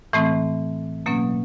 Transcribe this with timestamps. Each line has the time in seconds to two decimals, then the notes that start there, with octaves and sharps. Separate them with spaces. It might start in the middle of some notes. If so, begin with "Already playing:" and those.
0.13 A2 E3 A3 C4
1.06 B2 F#3 A#3 C#4